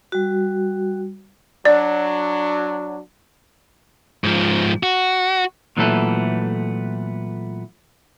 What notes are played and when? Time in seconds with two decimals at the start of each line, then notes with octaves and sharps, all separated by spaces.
0.12 G3 F#4
1.65 F#3 D4 D5
4.24 G#2 F3
4.83 F#4
5.77 A#2 E3 F#3 A3 B3 A4